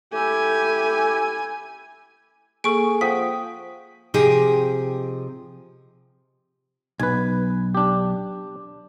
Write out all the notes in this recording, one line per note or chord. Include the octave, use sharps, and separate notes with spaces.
A3 E4 G4 G#5
A#3 G#4 A4 C#6 D7
F3 F#5 G5 D#6 B6
C3 F3 C4 D#4 G4 G#4
B1 B4 G#5
D4 G4